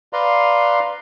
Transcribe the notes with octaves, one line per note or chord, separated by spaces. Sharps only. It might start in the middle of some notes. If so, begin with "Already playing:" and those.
B4 D5 F5 A#5 C6